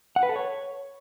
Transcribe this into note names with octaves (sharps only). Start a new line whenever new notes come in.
F#5
B4
A4
C#5